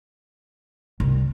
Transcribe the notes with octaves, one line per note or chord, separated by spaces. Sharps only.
C2